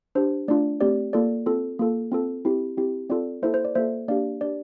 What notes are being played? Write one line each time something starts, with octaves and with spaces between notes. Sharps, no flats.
D4 G4 C5
A3 D4 F4 D5
A3 C4 G4 D5
A#3 F4 A4 D5
C4 F4 A4
A#3 F4 A4
C4 F4 A4
C4 E4 G4
C4 E4 G4
C4 F4 A4 D5
A#3 E4 A4 C5 E5
C5
D5
A#3 F4 A4 C5 E5
A#3 D4 G4 D5 F5
D4 G4 D5